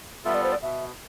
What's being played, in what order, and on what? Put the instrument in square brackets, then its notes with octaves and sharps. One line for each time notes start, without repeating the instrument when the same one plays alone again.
[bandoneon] G3 B3 F4 A4 [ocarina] E5
[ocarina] D5
C5
D5
[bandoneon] B2 [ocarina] E5